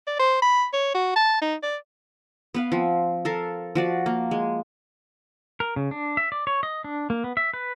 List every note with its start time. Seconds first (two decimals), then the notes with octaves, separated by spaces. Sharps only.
0.07 D5
0.19 C5
0.42 B5
0.73 C#5
0.95 F#4
1.16 A5
1.42 D#4
1.63 D5
2.54 B3 B4 F5
2.72 F3 C4
3.25 A4 A#4 F5
3.75 F3 F#4 D5
4.06 A#3
4.31 G#3
5.60 A#4
5.76 C#3
5.91 D4
6.17 E5
6.32 D5
6.47 C#5
6.63 D#5
6.84 D4
7.10 A#3
7.24 B3
7.37 E5
7.54 B4